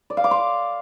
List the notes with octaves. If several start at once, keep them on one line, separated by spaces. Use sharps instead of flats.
D5
F5
D6
C6